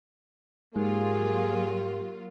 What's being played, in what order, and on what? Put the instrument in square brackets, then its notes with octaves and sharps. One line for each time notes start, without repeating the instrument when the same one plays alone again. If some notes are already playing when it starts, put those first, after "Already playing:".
[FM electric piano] G#2 [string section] F#3 A#3 F4 [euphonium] G4 [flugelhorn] G#4